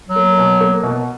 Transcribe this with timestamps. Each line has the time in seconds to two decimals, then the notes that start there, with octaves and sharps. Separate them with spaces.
0.08 F#3
0.16 A#3
0.38 B2
0.61 A#3
0.83 B2